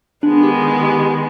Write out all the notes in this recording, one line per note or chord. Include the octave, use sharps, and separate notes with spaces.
D#3 G#3 B3 D4
G4
G#4
G4